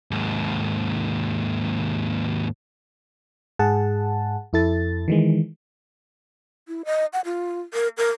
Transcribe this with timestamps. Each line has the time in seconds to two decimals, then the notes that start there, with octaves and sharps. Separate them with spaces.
0.11 D#2 G#2
3.59 G#2 G#4 F#5 A5
4.53 F2 E4 A4 A6
5.08 D#3 E3 G#3
6.68 E4
6.85 D#5
7.13 F#5
7.25 F4
7.74 A#4
7.97 A#4